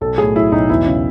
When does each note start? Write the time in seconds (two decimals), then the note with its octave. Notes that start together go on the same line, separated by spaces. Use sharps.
0.01 B1 A4
0.18 A2 G#4
0.35 F#3 E4
0.52 B1 D#4
0.69 E2 E4
0.86 C#3